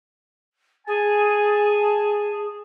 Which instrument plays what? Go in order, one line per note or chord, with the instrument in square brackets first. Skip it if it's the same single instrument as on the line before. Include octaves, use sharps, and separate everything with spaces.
[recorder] G#4 [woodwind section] G#5 A5